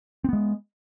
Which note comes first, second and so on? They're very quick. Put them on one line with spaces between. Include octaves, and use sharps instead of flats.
C4 B3 G#3